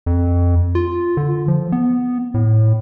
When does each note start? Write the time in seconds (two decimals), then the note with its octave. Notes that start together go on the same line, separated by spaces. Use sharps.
0.06 F2
0.75 F4
1.17 D3
1.48 F3
1.72 B3
2.34 A2